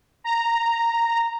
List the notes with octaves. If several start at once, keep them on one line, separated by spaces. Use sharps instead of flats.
A#5